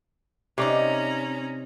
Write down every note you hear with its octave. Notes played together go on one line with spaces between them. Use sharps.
C3 C#4 D#4 C#5 D5 A#5